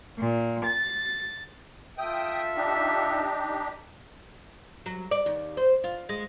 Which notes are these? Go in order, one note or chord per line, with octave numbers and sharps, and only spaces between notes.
A#2
A6
F4 A4 E5 G5 D#6
D4 D#4 G4
F#3
D5
D#2
C5
F4
G#3